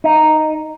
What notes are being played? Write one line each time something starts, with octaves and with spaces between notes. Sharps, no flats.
D#4